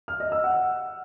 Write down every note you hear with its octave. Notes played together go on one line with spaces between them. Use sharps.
F6
D#5
E6
F#5